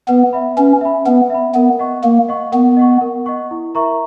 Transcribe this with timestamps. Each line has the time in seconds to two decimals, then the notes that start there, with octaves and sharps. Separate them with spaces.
0.08 B3 B4
0.33 E5 B5
0.57 C#4 B4
0.81 E5 B5
1.06 B3 B4
1.30 E5 B5
1.54 B3 A#4
1.79 D#5 F#5 C#6
2.04 A#3 A#4
2.28 D#5 F#5 C#6
2.52 B3 A#4
2.77 D#5 F#5 C#6
3.01 A#4
3.26 D#5 F#5 C#6
3.51 E4
3.75 A#4 E5 A#5 C#6